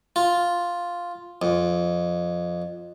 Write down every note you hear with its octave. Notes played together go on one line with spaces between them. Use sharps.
F4
F2